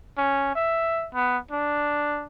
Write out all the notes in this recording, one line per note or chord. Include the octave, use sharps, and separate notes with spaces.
C#4
E5
B3
D4